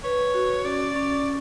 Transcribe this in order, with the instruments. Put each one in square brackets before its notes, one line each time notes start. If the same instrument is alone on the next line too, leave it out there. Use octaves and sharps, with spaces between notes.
[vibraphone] B4 [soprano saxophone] C#5
[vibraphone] F#4
[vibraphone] C#4 [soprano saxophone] D5
[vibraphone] C#4